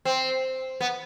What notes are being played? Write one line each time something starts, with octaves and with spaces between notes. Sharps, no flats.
C4
B3